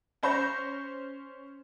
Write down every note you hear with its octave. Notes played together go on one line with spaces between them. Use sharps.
C#4 C5 C#6 G6 A#6 E7